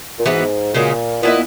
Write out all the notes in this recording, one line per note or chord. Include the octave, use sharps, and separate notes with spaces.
A#2
G#2 E3 B3 F#4 B4
A#2 C#3 G#3 C#4 F#4
A#2 B3 E4 B4 D#5